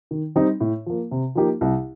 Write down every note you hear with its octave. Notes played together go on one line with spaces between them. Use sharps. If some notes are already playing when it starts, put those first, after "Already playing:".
D#3
G3 C4 D#4
A2
F3 A#3
C3
F3 A#3 D#4 G4
C2